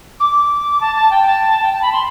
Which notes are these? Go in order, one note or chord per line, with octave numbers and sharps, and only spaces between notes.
D6
A5
A5
G5
A5
G5
A5
B5
C6